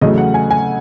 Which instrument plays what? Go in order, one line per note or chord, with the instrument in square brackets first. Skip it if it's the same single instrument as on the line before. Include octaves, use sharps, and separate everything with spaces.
[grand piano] E2 C#3 F#3 A3 D#5
F#5
G#5
G#5